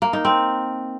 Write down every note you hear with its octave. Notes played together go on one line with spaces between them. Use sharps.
A#3
D#4
C4